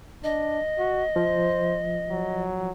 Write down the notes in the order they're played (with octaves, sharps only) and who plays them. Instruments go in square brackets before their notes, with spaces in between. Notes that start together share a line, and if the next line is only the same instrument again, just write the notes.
[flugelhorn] D4 [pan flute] D#5
[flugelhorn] F#4
[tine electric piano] F3 [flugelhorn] C5
[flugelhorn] F#3